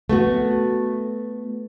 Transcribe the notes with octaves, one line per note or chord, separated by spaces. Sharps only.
A3 B3 F#4